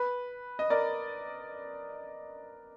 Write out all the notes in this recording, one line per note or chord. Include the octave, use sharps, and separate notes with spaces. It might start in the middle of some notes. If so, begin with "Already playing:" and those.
Already playing: B4
D#5
A#4 D5